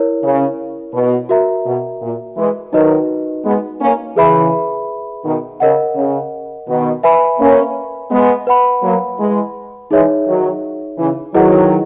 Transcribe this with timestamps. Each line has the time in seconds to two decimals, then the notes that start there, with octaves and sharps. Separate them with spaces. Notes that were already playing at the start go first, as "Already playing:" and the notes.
Already playing: E4 A#4 C#5
0.23 C#3
0.93 B2
1.29 F#4 A#4 E5 A#5
1.65 B2
2.02 A#2
2.37 E3 G#3
2.73 D#3 F#3 D#4 F#4 B4 D#5
3.44 G#3 B3
3.81 A#3 C#4
4.16 C#3 E3 G#4 B4 E5 B5
5.24 B2 D#3
5.60 C#3 A#4 D#5 F#5
5.95 C#3
6.68 B2 D#3
7.03 B4 E5 G#5 B5
7.39 A#3 C#4
8.11 G#3 B3
8.47 B4 F#5 B5
8.83 F#3 A#3
9.18 E3 G#3
9.91 E3 G#3 D#4 G#4 C#5 E5
10.27 D#3 F#3
10.98 C#3 E3
11.34 D#3 F#3 E4 G#4 B4 D#5 F#5